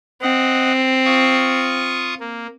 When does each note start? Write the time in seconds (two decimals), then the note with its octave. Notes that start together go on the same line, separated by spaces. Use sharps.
0.22 C4 D#5 F#5
1.05 F4 C#6 D#6
2.20 A#3